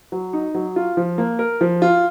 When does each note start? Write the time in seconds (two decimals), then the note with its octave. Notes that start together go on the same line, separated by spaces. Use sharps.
0.12 F#3
0.33 D#4
0.54 F#3
0.76 F4
0.97 F3
1.18 A#3
1.39 A#4
1.61 F3
1.82 F4